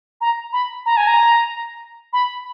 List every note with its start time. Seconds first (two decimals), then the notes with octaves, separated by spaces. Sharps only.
0.21 A#5
0.53 B5
0.86 A#5
0.97 G#5
1.08 A#5
2.13 B5